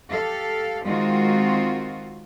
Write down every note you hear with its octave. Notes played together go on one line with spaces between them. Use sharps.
G4 A4 F5
D#3 G#3 C4 F4 F#4